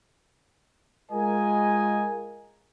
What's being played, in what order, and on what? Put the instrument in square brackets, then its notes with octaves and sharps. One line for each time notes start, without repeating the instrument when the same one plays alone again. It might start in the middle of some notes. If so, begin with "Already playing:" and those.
[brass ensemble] G#3 F4 A#4 D#5 G#5